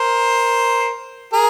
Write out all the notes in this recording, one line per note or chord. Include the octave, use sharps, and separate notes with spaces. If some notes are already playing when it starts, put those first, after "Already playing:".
Already playing: A#4 C5
G#4 A#4